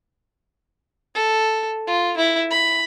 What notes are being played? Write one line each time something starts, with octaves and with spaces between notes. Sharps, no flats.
A4
F4
E4
B5